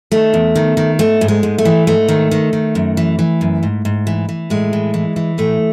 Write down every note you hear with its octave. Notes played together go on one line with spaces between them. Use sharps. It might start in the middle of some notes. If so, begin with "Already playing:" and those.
D#3 A3
E2
D#3
D#3
G#2 A3
G#2
G#3
G#2
A3
E3
G#2 A3
D#3
D#3
D#3
F#2
E3
E3
F#2
G#2
G#2
E3
E3
A2 G#3
E3
E3
E3
A2 A3